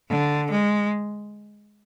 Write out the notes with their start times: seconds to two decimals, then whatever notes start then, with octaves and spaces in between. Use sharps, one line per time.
0.09 D3
0.51 G#3